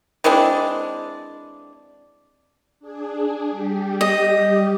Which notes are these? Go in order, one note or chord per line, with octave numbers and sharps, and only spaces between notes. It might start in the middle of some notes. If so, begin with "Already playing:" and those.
E3 G#3 C4 D4
D4 G#4
G3 G4
D#5